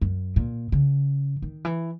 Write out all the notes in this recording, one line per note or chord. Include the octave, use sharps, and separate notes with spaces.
F#2
A#2
C#3
D#3
E3